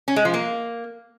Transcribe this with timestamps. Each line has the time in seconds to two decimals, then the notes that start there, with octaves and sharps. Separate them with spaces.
0.08 C#4
0.16 G#3
0.25 F3
0.34 A#3